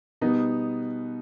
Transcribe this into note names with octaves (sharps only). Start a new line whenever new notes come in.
B2 G3 B3 D#4